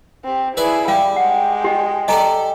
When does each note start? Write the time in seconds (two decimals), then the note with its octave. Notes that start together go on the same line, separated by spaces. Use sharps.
0.25 C4 G4
0.57 E4 G#4 B4 D5 E5
0.88 G3 F5 G5
1.16 G#3 F#5 G5
1.64 G4 D#5
2.08 G4 A4 D5 D#5 G#5 A#5